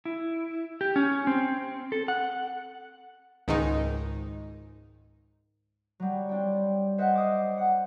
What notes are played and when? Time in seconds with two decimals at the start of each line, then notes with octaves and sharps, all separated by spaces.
0.05 E4
0.81 G4
0.96 C#4
1.27 C4
1.92 A4
2.08 F#5
3.48 C#2 G#2 D#3 D#4
6.00 F#3 G3
6.29 C4 D4 G5
6.98 C5 D#5 E5 F#5 F#6 G6
7.15 D6 D#6 C7
7.58 F#5